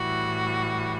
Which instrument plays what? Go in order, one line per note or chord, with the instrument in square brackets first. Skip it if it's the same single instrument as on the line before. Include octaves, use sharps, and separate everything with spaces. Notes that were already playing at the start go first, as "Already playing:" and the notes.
Already playing: [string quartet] A2 E3 G3 F#4